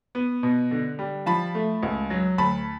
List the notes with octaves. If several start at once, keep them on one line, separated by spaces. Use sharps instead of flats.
B3
B2
D3
G3
F3 A5 B5
A3
C#2
F#3
D2 A5 B5